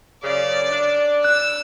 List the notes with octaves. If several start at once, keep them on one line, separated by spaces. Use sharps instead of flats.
F#2 C#3 D5
D4
E6 F#6